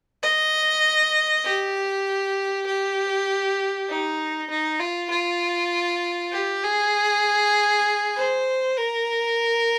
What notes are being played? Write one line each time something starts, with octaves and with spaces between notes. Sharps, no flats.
D#5
G4
G4
D#4
D#4
F4
F4
G4
G#4
C5
A#4